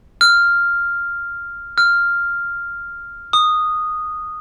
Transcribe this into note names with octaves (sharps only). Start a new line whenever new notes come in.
F6
F6
D#6